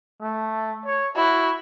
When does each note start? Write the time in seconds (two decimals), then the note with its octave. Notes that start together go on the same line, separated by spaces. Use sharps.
0.21 A3
0.85 C#5
1.16 E4 F#4